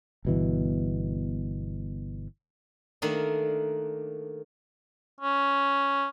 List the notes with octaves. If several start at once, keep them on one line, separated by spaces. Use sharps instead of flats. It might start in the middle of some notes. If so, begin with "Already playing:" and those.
G1 B2 E3
D#3 A3 A#3 D4
C#4